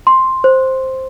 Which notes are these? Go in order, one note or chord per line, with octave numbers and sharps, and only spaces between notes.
C6
C5